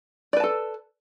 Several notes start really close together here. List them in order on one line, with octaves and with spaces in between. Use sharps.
D5 B4 A5 A4